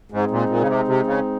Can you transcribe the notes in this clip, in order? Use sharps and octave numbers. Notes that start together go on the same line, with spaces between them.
G#2 G#3 C4 D#4
A#2
A#2
C#3
C3
C3
C#3